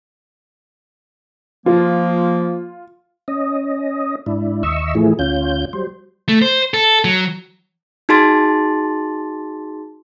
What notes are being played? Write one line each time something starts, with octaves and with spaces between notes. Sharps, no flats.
F3 A#3 F4
C#4 D#5
G#2 D4 E4
D#2 D#5 E5 C#6 E6
A2 E3 F3 A3 E4 G#4
D2 C#4 F4 G6
F#3 G3 C5
A3
C5
A4
F#3
D#4 F#4 G#4 A5 C6 A6